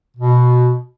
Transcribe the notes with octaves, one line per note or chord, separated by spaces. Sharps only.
B2